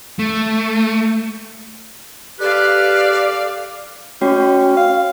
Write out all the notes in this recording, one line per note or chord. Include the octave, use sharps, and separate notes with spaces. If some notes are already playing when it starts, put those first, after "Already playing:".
A3
G4 A4 B4 D5 F5
A3 C#4 F#4 G5
F5